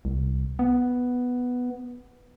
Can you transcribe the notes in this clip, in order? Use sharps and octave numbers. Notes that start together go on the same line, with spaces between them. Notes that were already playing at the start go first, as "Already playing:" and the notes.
C2
B3